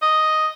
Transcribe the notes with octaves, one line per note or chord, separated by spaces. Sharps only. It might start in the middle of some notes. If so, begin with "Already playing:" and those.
D#5